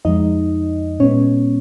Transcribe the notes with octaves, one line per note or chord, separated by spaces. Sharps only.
F2 F3 G#3 D#4 D#5
A#2 G#3 B3 C#4 C#5